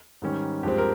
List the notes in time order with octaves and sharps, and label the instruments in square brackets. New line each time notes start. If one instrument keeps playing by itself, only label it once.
[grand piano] G#2 D#3 G3 C#4
G2 F3 G#3 C4 G4
A#4